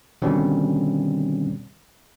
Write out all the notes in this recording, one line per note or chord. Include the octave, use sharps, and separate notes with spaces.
B2 D3 D#3 G3 C4 C#4